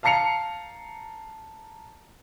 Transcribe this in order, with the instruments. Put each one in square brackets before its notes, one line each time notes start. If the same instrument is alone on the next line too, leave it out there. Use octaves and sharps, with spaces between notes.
[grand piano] F5 A5 A#5 C7 C#7 F7